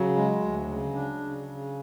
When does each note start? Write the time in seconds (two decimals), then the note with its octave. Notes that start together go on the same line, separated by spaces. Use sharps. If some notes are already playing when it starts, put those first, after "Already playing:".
Already playing: C#3 F#3
0.15 G#3
0.41 D2
0.67 C#3
0.94 D4
1.20 C#3
1.47 C#3